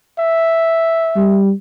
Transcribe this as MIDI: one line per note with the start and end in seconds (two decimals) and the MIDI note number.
0.19 1.40 76
1.16 1.52 55